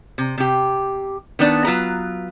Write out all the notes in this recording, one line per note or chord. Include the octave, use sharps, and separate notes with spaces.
C3
C3 G4
D#3 B3 D4
F#3 F4 B4 A#5